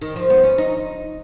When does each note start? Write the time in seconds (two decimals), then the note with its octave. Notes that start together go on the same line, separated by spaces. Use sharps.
0.01 D#3
0.16 F3
0.30 B3
0.43 C#4
0.58 D#4